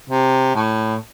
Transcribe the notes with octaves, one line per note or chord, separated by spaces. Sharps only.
C3
A2